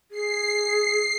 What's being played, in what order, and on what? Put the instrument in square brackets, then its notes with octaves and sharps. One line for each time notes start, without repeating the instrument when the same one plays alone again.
[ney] G#4 [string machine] C7